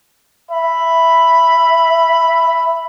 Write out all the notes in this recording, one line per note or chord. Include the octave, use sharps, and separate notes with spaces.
E5 B5